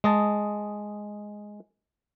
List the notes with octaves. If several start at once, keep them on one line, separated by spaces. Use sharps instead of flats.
G#3 D#5 A5